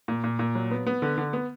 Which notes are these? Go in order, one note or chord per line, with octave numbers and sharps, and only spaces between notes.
A#2
A#2
A#2
F#3
B3
B3
D3
D3
B3